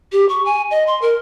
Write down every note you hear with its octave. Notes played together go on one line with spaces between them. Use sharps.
G4
C#6
G#5
D#5
C6
A#4